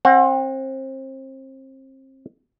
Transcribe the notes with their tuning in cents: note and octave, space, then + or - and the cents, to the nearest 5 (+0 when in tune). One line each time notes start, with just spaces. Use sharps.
C4 +30 F#5 -15